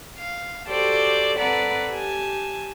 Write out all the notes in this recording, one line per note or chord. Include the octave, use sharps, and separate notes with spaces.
F5
F#4 G4 A4 C5 D5
C4 A4 B4 D5 F#5 A#5
G4 G#5 A5